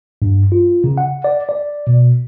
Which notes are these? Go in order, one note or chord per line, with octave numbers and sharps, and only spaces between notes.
G2
F4
C#3
F#5
D5
D5
B2